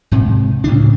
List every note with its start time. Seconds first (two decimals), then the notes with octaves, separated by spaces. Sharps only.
0.12 G#2 C3
0.64 D2 A2 C#3 D4